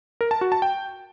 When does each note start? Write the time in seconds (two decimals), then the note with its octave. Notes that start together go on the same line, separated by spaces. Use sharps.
0.21 A#4
0.31 A5
0.41 F#4
0.52 A5
0.62 G5